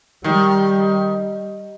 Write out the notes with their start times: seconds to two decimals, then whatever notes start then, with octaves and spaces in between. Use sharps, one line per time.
0.24 D#3 G3